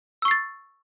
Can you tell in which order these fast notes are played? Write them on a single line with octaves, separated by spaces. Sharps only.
E6 C#6 C7 A6